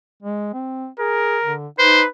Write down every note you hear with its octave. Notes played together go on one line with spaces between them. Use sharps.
G#3
C4
G#4 A#4
D3
D#4 B4 C5